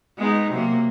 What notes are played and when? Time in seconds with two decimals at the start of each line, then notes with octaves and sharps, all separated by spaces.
0.18 G#3 B3 D#4
0.51 C3 F#3 A#3